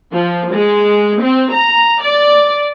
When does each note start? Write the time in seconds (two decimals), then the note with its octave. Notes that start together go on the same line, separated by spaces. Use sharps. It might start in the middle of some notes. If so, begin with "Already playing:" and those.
0.12 F3
0.52 G#3
1.22 C4
1.52 A#5
2.03 D5